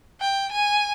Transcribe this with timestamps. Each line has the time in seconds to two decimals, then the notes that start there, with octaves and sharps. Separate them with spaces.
0.21 G5
0.52 G#5